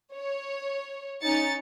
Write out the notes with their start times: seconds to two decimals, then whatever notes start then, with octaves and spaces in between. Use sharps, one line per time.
0.14 C#5
1.22 C#4 D#4 A6 C#7